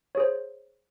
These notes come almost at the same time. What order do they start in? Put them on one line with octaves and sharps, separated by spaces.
C#5 G#4 C5